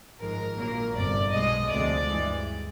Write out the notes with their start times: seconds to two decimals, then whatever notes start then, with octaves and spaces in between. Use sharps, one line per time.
0.20 G#1 G#2 F3 G#3 A#4
0.57 A#1 A#2 F#3 A#3 A#4
0.94 G1 F2 C3 D5
1.31 B1 B2 G#3 D#5
1.69 D2 C3 F3 G#3 D5
2.07 G2 E3 G#3